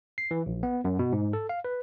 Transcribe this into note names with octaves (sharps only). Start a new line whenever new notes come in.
C7
E3
A#1
B3
F#2
B2
G#2
A4
F5
B4